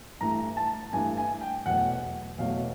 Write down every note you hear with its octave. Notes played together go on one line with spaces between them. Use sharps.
G2 E3 A3 A#5
A5
G2 E3 A3 G#5
G#5
G5
E2 B2 F#3 A3 F#5
E2 B2 F#3 A3 F5